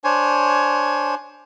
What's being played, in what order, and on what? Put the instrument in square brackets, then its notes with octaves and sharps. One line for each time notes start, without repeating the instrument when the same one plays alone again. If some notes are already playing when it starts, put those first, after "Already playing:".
[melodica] D4 C5 C#5 G#5